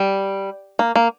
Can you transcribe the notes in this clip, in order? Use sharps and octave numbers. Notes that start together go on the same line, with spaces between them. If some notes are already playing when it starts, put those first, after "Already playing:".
Already playing: G3
A#3
A#3